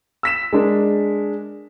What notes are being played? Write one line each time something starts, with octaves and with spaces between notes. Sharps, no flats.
E6 B6 E7
G#3 D4 A#4